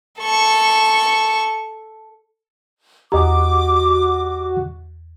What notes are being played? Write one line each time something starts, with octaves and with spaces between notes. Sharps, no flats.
A4 C#6
E2 F#4 G4 D#5 A#5 D6